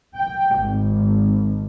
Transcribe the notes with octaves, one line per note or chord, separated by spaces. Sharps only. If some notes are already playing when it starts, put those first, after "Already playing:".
G5
G#1